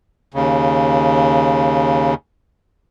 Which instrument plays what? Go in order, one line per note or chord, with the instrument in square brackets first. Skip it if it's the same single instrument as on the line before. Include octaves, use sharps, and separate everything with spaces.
[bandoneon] D#2 C#3